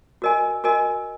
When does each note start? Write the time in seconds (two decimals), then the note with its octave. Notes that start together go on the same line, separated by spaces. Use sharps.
0.22 F#4 A#4 D#5 G#5
0.64 F#4 A#4 D#5 G#5